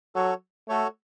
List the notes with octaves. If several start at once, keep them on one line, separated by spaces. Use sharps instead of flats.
F#3 F#4 A4 C#5
A3 F#4 A4 C#5